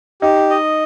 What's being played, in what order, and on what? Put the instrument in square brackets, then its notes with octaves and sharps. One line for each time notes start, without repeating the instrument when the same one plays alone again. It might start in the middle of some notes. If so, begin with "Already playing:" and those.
[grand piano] D#4 [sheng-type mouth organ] G4
[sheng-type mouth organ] D#5